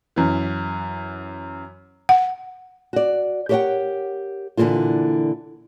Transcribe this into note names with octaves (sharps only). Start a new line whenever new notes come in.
F#2 E3
F#5
F#4 D5
G4 A#4 C#5 D#5 F#5 G5
A#2 D3 E3 G#3 A#3 F4